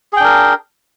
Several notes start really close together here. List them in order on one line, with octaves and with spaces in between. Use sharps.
G#4 G5 D4 A#4